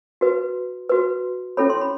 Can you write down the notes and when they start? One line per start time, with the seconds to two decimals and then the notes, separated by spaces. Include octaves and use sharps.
0.21 F#4 B4
0.89 F#4 B4
1.57 C#4 E4 A4 C#5 B5
1.70 C6
1.81 B5